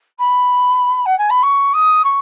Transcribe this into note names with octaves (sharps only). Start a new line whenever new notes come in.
B5
F#5
G#5
B5
C#6
D#6
C#6